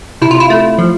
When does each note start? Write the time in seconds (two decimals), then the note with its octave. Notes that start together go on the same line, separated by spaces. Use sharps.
0.22 C3 E4
0.31 F4
0.40 E4
0.50 A3
0.78 F3